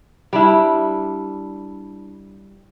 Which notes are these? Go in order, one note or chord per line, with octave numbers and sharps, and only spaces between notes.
G3 D4 E4